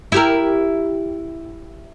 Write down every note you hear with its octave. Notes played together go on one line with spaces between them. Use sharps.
E4 G4 A#4